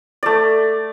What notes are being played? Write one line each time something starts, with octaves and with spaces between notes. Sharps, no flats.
A3 D5